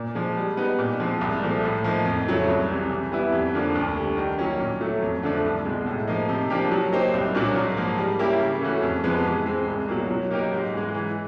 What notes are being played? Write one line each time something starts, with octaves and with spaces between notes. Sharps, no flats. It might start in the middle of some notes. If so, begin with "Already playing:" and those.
Already playing: A#2
F3 G#3
G3
B3 D#4
A#2
F3 G#3 C4
C2
A#2 F3 A3
A2
F3 A#3 D#4
F2
C#3 F#3 A3
C2
C3 E3
E3
G3 B3 E4
F2
D3 F3 A#3 D4
D2
D3 G3
D#3
F#3 A#3 C#4
A#2
F#3 A3
F2
D3 F3 A3 D4
C2
B2 G#3
A2
F3 A#3 D#4
C3
F3 A#3 D4 G4
F#3
A#3 D#4 G4 C5
C2
A#2 F#3 A#3 D4
G#2
F3 A#3
G3
A#3 C#4 E4 G4
C#3
E3 A3 C#4 F#4
F2
C3 F3 G#3 B3
E3
G#3 C4
C2
B2 F#3 A#3
F#3
A#3 D#4 G4 A#4
G#2
E3 G#3
E3